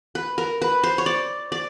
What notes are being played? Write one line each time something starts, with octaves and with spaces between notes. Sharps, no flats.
B4
A#4
B4
C5
C#5
D5
D5